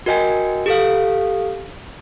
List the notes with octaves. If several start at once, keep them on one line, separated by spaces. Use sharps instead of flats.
F#4 A#4 D#5 G5 G#5
G4 A4 F5